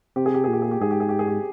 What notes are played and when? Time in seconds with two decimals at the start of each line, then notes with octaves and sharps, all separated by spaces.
0.16 C3 G4
0.26 G#4
0.34 G4
0.44 A#2 G#4
0.53 G4
0.62 G#4
0.71 G4
0.81 G#2 G#4
0.91 G4
1.00 G#4
1.09 G4
1.19 G#4
1.28 G4